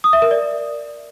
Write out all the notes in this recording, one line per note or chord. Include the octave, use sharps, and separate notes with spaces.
D#6
E5
A#4
D5